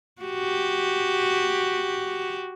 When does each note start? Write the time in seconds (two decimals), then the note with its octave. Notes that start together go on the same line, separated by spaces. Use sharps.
0.22 F#4 G4